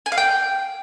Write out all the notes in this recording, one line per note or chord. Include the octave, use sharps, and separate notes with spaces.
G#5
F5
G5